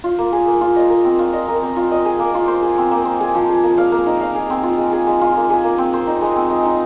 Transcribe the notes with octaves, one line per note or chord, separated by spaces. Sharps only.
F4
A#3
G#4
A#3
F4
D#5
A#4
C4
F4
D#5
A#4
C4
F4
D#5
G#4
A#3
F4
C5
G#4
C4
A#3
C5
G#4
F3
G#4
A#3
F5
A#3
D#4
F5
G#4
C4
F4
G#3
G#4
G#3
F4
A#3
G#4
A#3
C4
C5
D#4
G#3
C4
G#3
D#4